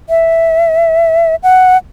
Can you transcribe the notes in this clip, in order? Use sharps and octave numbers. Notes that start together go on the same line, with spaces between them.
E5
F#5